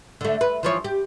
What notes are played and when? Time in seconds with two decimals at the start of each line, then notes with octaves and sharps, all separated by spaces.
0.21 D3 A3
0.41 B4
0.63 E3 F3 C#5
0.84 G4